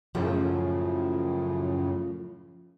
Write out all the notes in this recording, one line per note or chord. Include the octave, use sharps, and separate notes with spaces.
F#2 A2 C#3 F3